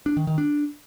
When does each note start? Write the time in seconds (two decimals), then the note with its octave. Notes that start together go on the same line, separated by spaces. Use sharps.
0.06 D4
0.17 D#3
0.27 D#3
0.38 D4